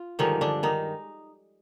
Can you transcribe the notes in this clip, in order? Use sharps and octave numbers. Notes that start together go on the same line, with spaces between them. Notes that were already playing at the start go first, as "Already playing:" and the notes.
Already playing: F4
G2 D3 D#3 F3 G#3 D#4
D3 D4
D#3 D#4